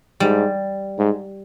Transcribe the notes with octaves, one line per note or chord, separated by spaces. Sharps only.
G#2 G3
G#2